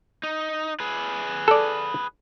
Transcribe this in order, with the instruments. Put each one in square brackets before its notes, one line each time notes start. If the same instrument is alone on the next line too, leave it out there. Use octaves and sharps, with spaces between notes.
[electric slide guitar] D#4
G#4 B4
[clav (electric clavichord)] A4 D5